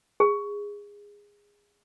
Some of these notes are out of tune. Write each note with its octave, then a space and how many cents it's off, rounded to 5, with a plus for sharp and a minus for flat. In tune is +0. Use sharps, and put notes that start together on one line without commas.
G#4 -20